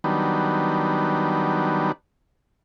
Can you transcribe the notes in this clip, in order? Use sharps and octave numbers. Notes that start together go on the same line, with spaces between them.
D#3 F#3 G3 B3 D4